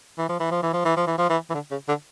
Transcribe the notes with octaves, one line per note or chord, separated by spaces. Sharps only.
E3
F3
E3
F3
E3
F3
E3
F3
E3
F3
E3
E3
D3
C#3
D3